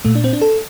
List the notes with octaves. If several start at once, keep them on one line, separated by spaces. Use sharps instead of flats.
A#2 A3
D4
C4
D4
A4